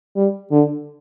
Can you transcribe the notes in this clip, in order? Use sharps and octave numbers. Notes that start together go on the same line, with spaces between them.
G3
D3